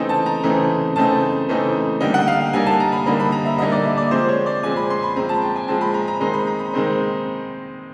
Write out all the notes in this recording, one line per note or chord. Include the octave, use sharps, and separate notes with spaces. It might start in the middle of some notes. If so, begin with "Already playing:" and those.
Already playing: C#3 E3 A3 C4 D#4 G5
A5
A#5
C#3 E3 A3 C4 D#4
C#3 E3 A3 C4 D#4 A5
C#3 E3 A3 C4 D#4
D3 G3 A#3 D#4 G5
F#5
F5
G5
D3 G3 A#3 D#4 G#5
A5
A#5
B5
D3 G3 A#3 D#4 B5
B5
A#5
E5
D3 G3 A#3 D#4 D#5
D5
E5
D5
F3 G#3 C4 C5
C#5
D5
F3 G#3 C4 G#5
B5
C6
B5
F3 G#3 C4 A#5
A5
G5
G#5
F3 G#3 C4 A5
B5
A#5
A#5
D#3 G#3 C4 D#4 C6
B5
A#5
B5
D#3 G#3 C4 D#4